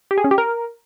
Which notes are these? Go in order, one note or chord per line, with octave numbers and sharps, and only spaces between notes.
G4
G#4
C#4
G4
A#4